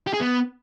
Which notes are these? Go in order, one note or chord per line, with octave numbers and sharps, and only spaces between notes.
G4
G#4
B3